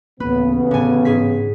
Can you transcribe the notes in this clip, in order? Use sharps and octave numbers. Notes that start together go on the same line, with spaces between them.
D1 A1 C#3 A#3 B3 B4
A2 D3 C4 G#5
G#2 G#4 B6